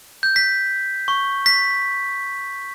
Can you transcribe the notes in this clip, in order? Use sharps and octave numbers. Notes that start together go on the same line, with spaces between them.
G6
B6
C#6
B6